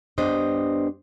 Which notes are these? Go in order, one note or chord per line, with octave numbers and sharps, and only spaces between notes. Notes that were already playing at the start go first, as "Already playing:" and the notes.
G2 B3 D4 G4 C5 D#5